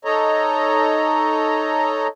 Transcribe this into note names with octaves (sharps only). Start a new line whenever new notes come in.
D#4 A4 C#5 D#5 A#5